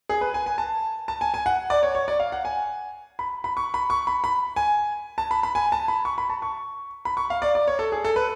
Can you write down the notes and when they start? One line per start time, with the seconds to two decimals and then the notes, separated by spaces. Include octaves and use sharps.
0.09 G#4
0.21 B4
0.34 G#5
0.46 G#5
0.58 A5
1.08 A5
1.21 G#5
1.34 G#5
1.46 F#5
1.70 D5
1.83 C#5
1.95 C#5
2.08 D5
2.20 F5
2.32 F#5
2.45 G#5
3.19 B5
3.44 B5
3.57 C#6
3.74 B5
3.90 C#6
4.07 B5
4.24 B5
4.56 G#5
5.18 A5
5.31 B5
5.43 B5
5.55 G#5
5.72 A5
5.88 B5
6.05 C#6
6.18 B5
6.30 A5
6.42 C#6
7.05 B5
7.17 C#6
7.30 F5
7.42 D5
7.55 D5
7.68 C#5
7.79 A4
7.92 G#4
8.05 A4
8.16 B4